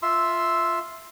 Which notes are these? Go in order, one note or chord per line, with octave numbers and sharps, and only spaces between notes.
F4 E5 C6 E6